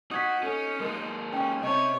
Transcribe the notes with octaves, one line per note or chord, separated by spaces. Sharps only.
D#4 F#4 D#6 G#6 B6
C#4 A4
G#3 A#3 A#4
C#4 D#4 G5
C3 C#5 D#5 A5